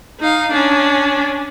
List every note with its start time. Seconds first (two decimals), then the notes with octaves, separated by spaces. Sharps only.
0.20 D#4 F5
0.52 C#4 D4